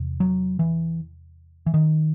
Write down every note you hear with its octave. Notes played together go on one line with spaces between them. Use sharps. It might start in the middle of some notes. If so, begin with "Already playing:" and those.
Already playing: E2 C3
F#3
E3
E3
D#3